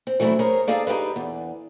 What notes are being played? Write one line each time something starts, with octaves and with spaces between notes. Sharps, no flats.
C4
E3 F#3 A3 C4 D4 E4
G#4 A#4 C5 C#5
D#4 G#4 A4 D5 F5
D#4 G4 G#4 B4
E2